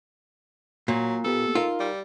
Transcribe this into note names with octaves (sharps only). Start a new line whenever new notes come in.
A#2 F#3
A#3 B3 G4 A4
D#4 F4 A#4 F5
G3